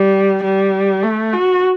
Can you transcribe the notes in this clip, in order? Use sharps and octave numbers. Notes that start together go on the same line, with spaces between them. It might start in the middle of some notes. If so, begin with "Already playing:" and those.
Already playing: G3
G3
A3
F#4